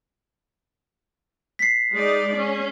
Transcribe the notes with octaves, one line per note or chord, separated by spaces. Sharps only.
B6 C7
G#3 D#4 D5
C#4